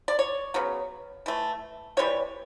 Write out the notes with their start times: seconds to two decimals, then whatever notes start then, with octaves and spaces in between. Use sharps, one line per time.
0.08 D5
0.19 C#5
0.54 C#3 F#3 B3
1.26 E3 A3
1.97 C3 E3 G3 C#5